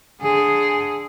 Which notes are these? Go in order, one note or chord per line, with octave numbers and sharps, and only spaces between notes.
D3 G#4